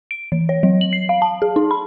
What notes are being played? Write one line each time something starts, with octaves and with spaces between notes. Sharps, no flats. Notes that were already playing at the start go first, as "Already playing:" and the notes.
D7
E3
C#5
F#3
F#7
C7
F5
A5
G#4
D#4
B5